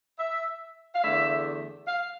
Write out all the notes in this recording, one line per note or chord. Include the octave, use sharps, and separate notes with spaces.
E5
F5
E2 D3 A3 E5
F5